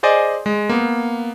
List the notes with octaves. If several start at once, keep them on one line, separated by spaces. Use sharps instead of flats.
G#4 C5 D5 D#5 G#5
G#3
A#3 B3